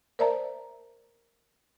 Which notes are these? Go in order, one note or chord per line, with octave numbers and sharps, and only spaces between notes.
A#4 C5 D5 E5 A5 A#5